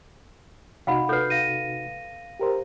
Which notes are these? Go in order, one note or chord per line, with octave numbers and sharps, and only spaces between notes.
C3 D#4 F#4 F5 F#5 B5
A4 B4 G6 C7
F5 A#6 D#7
G4 A#4 C5